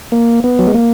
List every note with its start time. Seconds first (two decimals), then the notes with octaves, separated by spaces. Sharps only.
0.12 A#3
0.44 B3
0.59 F#3
0.67 G#3
0.74 A#3